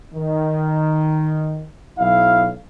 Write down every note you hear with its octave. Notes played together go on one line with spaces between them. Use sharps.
D#3
B1 F#3 E4 F5